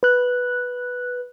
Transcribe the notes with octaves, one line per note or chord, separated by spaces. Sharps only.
B4 F#6